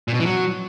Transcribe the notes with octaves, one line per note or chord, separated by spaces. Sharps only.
A#2
B2
E3
F#3